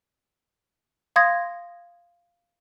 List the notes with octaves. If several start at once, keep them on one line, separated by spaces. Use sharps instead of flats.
F5 C6 D#6 G#6 A#6